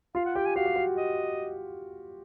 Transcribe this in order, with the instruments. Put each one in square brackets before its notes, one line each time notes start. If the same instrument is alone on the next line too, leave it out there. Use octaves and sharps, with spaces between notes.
[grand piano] F4 [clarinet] F5
[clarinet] F#5
[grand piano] G4 [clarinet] G5
[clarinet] G#5
[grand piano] F#4 [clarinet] F5
[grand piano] G4
F#4
[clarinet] D#5